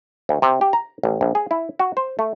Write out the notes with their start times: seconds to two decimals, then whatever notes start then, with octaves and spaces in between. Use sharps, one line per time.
0.29 D2
0.42 C3
0.61 G4
0.73 A#5
1.03 A1
1.21 A#1
1.35 G#4
1.51 E4
1.79 F#4
1.97 C5
2.19 A3